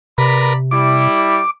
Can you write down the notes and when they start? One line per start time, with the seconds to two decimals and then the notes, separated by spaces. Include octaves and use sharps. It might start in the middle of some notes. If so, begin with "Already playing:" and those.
0.18 C3 A#4 B4 D5 A#5 B5
0.71 G3 E4 D6